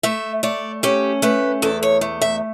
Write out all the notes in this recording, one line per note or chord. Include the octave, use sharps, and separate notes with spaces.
A3 E5
A3 D5
C#4 G4
A3 B4
E2 A4
C#5
A3
E5